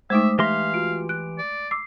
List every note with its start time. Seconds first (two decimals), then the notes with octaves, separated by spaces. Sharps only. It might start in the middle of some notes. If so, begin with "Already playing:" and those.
0.10 G#3 A3 D#4 C5 E5 D6 D#6
0.39 E3 G4 E5 F5 C6 A#6 B6
0.74 F4 F#4 D7
1.09 F#6 D7
1.38 D5
1.71 D6 E6 C7